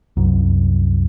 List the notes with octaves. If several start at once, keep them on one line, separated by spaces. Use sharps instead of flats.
C2 F#2